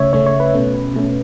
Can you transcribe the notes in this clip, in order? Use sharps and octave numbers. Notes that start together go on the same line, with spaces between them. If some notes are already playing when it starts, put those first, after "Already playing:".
Already playing: C#3 A3 C#4 C#5 E5
C#3 A3 C#4 C#5
C#5
B4
B2 A3 C#4
B2 A3 C#4